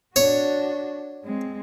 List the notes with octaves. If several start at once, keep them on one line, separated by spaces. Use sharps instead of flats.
D4 F#4 C#5
G#3 C4